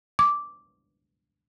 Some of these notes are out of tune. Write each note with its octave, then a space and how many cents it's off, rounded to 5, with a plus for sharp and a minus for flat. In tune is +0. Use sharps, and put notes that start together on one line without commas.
D6 -5